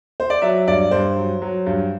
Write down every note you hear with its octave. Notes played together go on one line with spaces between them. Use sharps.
C5
D5
F#3 E5
G2 D5
G2 C5
F#3
F#3
G2